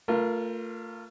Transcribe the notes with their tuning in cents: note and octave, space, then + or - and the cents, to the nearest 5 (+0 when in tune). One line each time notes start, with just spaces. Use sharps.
A3 +40 F4 +0 A#4 +30